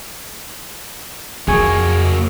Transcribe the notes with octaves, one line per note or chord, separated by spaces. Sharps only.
F2 F#3 A#3 G#4 G#5 C#6